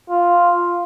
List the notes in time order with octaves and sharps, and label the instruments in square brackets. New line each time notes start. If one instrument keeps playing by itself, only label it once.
[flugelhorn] F4